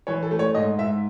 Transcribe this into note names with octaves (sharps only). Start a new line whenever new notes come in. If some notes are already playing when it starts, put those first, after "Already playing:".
E3 C#5
A4
A3
C#5
G#2 D#5
G#2 E5